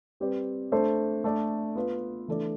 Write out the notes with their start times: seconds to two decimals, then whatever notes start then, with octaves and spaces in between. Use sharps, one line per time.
0.20 G3 C4 G4 B4 D5
0.72 A3 D4 A4 C5
1.24 A3 D4 A4 D5
1.75 B3 F4 B4
2.28 E3 A3 D4 A4 D5